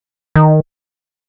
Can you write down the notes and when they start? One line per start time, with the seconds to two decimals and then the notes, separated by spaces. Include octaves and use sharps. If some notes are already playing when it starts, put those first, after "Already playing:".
0.36 D#3